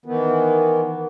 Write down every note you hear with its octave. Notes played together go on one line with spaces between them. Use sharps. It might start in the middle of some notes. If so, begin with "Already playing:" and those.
D#3 E3 B3